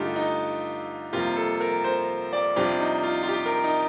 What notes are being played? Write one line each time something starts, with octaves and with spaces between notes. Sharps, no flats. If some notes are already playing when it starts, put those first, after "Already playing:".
Already playing: G2 D3 A3 D#4 F4 G4
D#4
F2 C3 G3 A#3 F4
A4
A#4
C5
D5
F2 C3 G3 D4 F4
D#4
F4
F4
G4
A#4
D#4